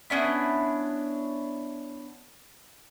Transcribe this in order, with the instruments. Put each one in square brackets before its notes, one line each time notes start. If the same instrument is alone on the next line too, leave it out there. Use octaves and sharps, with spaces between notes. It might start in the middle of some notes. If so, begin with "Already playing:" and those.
[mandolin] B3 C#4 D4 E4